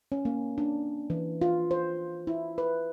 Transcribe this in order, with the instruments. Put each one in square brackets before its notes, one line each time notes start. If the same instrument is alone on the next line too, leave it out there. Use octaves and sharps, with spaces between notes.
[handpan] C#4
A#3
D4
E3
F4
C5
E4
B4